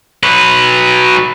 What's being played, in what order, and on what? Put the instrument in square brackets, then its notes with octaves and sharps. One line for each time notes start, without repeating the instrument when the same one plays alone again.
[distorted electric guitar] F#3 B4